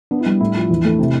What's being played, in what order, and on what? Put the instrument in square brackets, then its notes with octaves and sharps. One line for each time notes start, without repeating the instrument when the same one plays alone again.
[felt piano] B3 [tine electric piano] D4
[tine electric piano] E4
[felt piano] G3
[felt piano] A2 [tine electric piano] E4
[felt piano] F3
E2
A3
C3